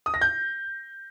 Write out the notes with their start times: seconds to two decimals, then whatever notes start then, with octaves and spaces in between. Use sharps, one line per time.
0.06 D#6
0.14 A#6
0.21 G6